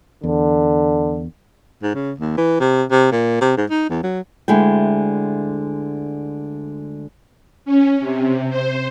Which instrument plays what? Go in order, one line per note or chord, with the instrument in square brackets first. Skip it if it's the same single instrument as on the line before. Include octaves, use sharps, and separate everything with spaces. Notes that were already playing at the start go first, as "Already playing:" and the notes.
[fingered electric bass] E2 [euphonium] D3
[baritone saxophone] G#2
C#3
D#2
E3
C3
C3
A#2
C3
G#2
D#4
E2
F#3
[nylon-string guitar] D2 D3 G#3 E4 G5
[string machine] C#4
C3
C5